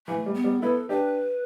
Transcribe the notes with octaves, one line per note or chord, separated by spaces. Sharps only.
E3 A3
G3
B3
G3
B3 E4 A4
D4 G4 B4